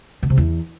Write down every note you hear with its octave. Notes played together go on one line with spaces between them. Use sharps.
B2
C3
E2